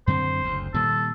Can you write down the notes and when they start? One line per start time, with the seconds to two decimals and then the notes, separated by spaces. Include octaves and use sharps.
0.07 F#2 D3 C4 C5
0.45 F#1 D2
0.74 A#2 D#3 G3 A4